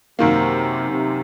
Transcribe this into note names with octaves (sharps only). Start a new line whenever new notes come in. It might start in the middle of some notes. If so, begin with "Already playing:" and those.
F#2 C3 D#3 A#3
C3